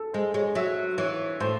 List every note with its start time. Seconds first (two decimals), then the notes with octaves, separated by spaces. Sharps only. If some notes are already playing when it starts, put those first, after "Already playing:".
Already playing: A4
0.14 G#3 C5
0.34 G#3 C#5
0.55 F#3 E5
0.98 E3 C#5
1.40 A2 C5